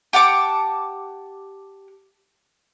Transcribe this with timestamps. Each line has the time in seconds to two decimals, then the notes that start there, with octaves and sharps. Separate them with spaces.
0.13 G4 F#5 A5 D6